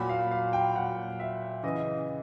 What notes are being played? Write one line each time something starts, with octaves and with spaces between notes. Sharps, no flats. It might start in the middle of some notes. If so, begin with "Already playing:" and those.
Already playing: A#2 F#3 B5
F5
F5
G5
A#2 F#3 F#5
E5
C#3 E3 D#5